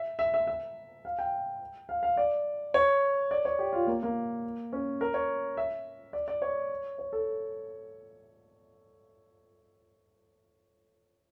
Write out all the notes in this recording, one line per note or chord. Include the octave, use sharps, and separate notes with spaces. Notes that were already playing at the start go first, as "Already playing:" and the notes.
Already playing: E5
E5
E5
E5
F5
G5
F5
F5
D5
C#5
D5
C#5
G4
F4
A#3
A#3
C#4
A#4
C#5
E5
D5
D5
C#5
C#5
A4